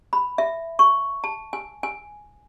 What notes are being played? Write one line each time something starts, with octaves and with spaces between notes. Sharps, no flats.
B5
E5
C#6
A5
G#5
G#5